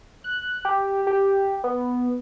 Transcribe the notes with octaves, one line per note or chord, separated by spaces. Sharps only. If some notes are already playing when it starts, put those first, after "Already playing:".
F#6
G4
G4
B3